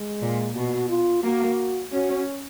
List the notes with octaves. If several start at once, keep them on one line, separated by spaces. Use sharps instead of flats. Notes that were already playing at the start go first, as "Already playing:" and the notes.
Already playing: G#3
A#2
B2 F#4
F4
A#3 F#4
C#4 F#4